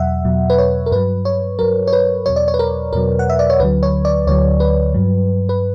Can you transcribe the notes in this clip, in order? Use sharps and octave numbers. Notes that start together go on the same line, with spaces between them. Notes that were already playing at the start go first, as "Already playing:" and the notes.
Already playing: E2 B2 F#3 E5 F#5
E2 B2 F#3
B4
C#5
A#4
G2 F#3 B4
C#5
G2 F#3 A#4
C#5
B4
E2 B2 F#3 C#5
D5
C#5
B4
A#4
E2 B2 F#3 A#4
F#5
E5
D5
C#5
D2 D3 F#3 B4
C#5
D5
D2 D3 F#3 C#5
B4
G2 F#3
B4